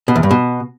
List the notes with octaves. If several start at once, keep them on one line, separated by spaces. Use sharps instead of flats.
B2
E2
G2
B2